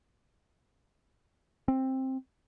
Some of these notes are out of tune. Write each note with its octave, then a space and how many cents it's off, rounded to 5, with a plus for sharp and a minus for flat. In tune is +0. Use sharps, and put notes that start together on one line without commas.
C4 +10